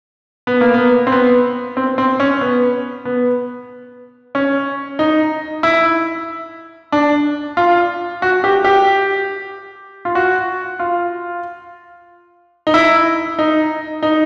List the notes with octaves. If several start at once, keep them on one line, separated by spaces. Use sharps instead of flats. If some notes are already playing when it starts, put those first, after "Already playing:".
B3
A#3
B3
C4
B3
C4
C4
C#4
B3
B3
C#4
D#4
E4
D4
F4
F#4
G4
G4
F4
F#4
F4
D#4
E4
D#4
D#4